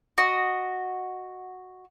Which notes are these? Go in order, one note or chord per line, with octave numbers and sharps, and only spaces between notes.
F#4 D#5